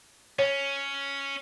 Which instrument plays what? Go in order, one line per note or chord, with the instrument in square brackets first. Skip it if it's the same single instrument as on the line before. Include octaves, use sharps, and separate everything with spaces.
[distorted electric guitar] C#4 [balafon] C#5